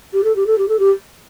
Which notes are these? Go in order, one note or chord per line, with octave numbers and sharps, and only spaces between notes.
G4
A4
G4
A4
G4
A4
G4